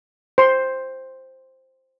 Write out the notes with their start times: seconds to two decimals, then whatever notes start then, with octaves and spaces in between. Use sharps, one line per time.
0.38 C5 C6